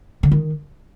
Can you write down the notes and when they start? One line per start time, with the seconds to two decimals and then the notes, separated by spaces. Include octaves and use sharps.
0.23 D3
0.31 D#3